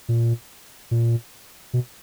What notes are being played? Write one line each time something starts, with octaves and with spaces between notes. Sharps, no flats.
A#2
A#2
B2